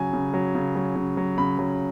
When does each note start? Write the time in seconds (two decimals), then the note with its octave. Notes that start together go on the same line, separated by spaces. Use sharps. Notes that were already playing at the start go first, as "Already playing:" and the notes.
Already playing: C#3 F#3 G#5
0.13 C#3
0.34 F#3
0.55 C#3
0.76 F#3
0.96 C#3
1.17 F#3
1.38 C#3 B5
1.59 F#3